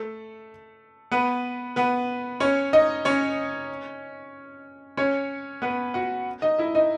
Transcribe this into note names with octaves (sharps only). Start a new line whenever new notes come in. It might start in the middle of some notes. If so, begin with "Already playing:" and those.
Already playing: A3 A4
B3 B4
B3 B4
C#4 C#5
D#4 D#5
C#4 C#5
C#4 C#5
B3 B4
F#4 F#5
D#4 D#5
E4 E5
D#4 D#5